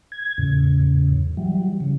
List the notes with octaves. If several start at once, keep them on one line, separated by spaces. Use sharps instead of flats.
G#6
E2 A2 C#3
E3 F#3 G3
C#3